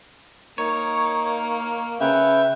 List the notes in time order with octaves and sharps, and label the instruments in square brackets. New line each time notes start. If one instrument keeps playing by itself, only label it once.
[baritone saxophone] A#3 [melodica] D#4 [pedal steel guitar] C#5
[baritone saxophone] C#3 [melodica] B4 G5 [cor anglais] E5